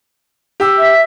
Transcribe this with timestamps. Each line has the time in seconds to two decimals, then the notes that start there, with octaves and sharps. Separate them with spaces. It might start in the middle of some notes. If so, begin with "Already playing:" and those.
0.60 G4 E6
0.78 E5